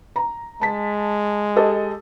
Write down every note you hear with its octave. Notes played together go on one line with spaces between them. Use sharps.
A#5
G#3 A5 B6
G4 A4 D#5